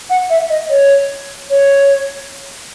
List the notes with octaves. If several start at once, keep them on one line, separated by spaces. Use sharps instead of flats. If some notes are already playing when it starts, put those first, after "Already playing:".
F#5
E5
D#5
C#5
C#5